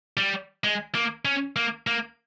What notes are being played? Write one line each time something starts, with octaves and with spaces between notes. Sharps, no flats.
G3
G#3
A#3
C#4
A#3
A#3